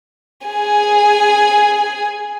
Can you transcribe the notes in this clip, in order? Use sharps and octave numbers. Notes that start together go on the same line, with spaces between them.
G#4 G#5